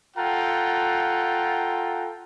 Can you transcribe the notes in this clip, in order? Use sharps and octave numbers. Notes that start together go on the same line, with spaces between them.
F4 A4 F#5 G5 A#5